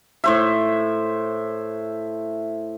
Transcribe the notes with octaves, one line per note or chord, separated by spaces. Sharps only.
A2 C5 E5